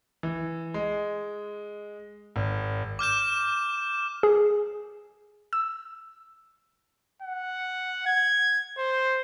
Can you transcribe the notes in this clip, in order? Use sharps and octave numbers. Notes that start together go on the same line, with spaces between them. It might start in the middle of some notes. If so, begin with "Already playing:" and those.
E3
G#3
G#1
D6 F6 G6 E7
G#4
E6
F#5
G#6
C5